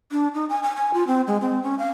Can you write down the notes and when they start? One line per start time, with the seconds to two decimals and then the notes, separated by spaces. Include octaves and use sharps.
0.12 D4
0.34 D#4
0.49 G#5
0.63 G#5
0.76 G#5
0.94 F4
1.07 C4
1.27 G#3
1.41 C4
1.63 C#4
1.79 F5